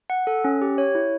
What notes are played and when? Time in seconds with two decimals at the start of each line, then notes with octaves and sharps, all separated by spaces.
0.10 F#5
0.27 A4
0.45 C#4
0.62 G4
0.78 C#5
0.95 E4